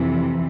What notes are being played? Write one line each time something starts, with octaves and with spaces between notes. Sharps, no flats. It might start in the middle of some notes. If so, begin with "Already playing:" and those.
Already playing: F2 C3 E3